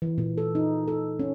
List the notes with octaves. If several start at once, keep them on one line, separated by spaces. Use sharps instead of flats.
E3
A#2
A4
D#4
A4
C#4